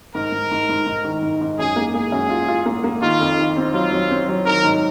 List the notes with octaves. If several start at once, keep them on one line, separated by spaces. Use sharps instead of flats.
G#2 A#4
G#2
G#2
G#2
G#2
D#3
G#2
G#2
F#2 G#4
A#3
A#3 G#4
F#2
F4
F4
A#3
A#3
D#3 F4
F2
D#3
C4
F#3 F4
F#3
C4
F#3
D#3 A#4
G#2